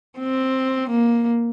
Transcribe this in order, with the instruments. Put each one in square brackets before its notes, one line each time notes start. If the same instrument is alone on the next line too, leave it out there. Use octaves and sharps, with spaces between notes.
[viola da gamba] C4
A#3